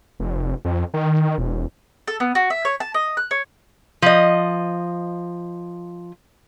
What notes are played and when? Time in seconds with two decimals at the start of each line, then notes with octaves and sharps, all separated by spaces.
0.20 F1
0.65 F2
0.94 D#3
1.38 E1
2.08 A4
2.20 B3
2.35 F#4
2.50 E5
2.65 C#5
2.80 A5
2.94 D#5
3.17 F#6
3.31 C#5
4.02 F3 D#5